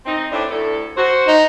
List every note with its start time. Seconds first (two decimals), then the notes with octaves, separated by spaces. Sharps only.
0.06 C4 D#4
0.31 A2 C4 D4
0.50 D2 A2 A4
0.97 F#4 C5
1.28 D#4